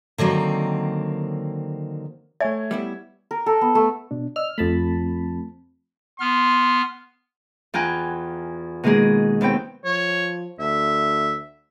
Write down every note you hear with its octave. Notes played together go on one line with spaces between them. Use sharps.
D3 D#3 F#3 A#3 C4
A3 C#5 E5 G#5 C#6 G#6
G3 B3 E4
A#4
A4
B3
A3
B2 D4
D5 D#5 E6 F6
F2 A3 C4 A5 B5
B3 C6 F6
E2 F4 G5 G#5 A#5 F#6
B2 D#3 G#3 A#3 G#4
D#2 B3 C4 G5
F3 C#5
D2 E5